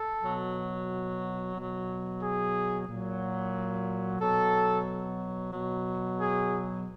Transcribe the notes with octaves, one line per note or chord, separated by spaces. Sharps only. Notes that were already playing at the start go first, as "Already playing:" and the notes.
Already playing: A4
B2 F#3
B2 F#3
G#4
A#2 F#3
B2 F#3 A4
B2 F#3
G#4